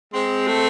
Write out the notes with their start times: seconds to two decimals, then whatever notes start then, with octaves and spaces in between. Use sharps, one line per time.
0.14 G#3 C4
0.48 A3